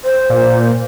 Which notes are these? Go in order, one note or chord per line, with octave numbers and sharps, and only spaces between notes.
C5
A#2